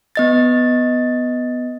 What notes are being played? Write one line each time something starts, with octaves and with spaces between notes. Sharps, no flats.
B3 D#5 A6